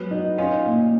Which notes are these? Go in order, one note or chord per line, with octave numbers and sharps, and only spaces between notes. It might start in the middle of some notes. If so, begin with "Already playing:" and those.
Already playing: F#3 G#3 B3
D#4
C#4 D#4 F4
A#2